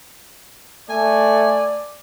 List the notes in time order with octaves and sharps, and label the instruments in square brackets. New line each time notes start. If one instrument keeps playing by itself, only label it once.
[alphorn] A3 [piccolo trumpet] D5 [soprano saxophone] G#5